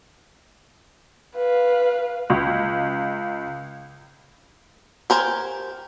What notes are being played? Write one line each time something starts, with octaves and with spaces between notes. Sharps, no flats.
B4 F5
C#2
G4 A#4 C5 G#5